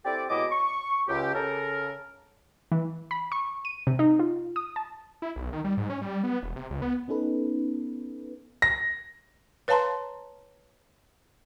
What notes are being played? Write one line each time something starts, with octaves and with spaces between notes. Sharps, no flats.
C4 E4 G4 A4 D5
B2 F#3 G#3 E4 D#5 D6
C#6
C#2 G4
C#3 A4 A#4
E3
B5
C#6
D#7
C3
D#4
F4
D#6
A5
E4
B1
D#3
G3
G#2
C#4
G3
B3
E1
C3
C#2
B3
B3 C#4 D#4 A4 B4
A#6
B4 C#5 F5 A5 A#5 C6